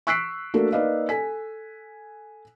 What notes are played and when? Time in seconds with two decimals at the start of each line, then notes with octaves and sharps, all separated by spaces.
0.07 C#6 E6 F#6 B6 C7 D7
0.54 A3 A#3 D4 F#4 A4
0.72 A#3 D#4 B4 D5 D#5 F5
1.09 A4 G#5 B6